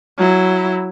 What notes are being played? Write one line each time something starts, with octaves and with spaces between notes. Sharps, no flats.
F#3 E4